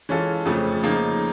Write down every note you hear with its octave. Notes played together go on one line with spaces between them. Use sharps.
E3 G#3 C#4 F4 A4
F2 C#3 F3 A3 C#4
C#3 F3 A#3 D#4